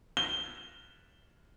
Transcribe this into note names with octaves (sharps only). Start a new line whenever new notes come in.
G7